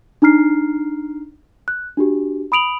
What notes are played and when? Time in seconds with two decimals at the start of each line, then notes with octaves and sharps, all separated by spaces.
0.22 D4 D#4 A#5 F6 C7
1.68 F#6
1.97 D4 F#4 G4
2.52 B5 D#6 D7 F7 F#7